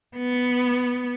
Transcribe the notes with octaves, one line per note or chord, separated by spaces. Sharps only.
B3